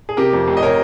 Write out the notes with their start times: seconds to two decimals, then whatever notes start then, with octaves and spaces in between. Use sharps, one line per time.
0.09 G#4
0.17 C3 G4 A#4
0.33 F2
0.48 F1
0.57 D#5
0.63 A#4 C#5